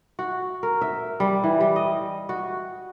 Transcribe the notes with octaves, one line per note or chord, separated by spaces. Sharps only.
F#4
A#4
E5
G3
E3
G3
D#5
F#4